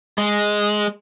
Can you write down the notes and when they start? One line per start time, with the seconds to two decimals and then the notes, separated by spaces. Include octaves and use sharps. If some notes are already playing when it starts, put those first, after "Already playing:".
0.18 G#3